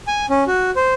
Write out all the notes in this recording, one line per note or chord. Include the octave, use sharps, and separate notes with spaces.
G#5
C#4
F#4
C5